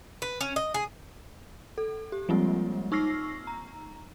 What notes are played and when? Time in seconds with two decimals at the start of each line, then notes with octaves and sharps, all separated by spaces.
0.22 B4
0.41 C#4
0.56 D#5
0.74 G#4
1.78 A4
2.12 G4
2.29 F3 G3 G#3 A#3 C4 F4
2.92 D#4 C#6 E6 F6 A#6 C7
3.47 A#5